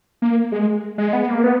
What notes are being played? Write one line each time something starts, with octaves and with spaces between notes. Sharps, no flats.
A#3
G#3
G#3
B3
A#3
B3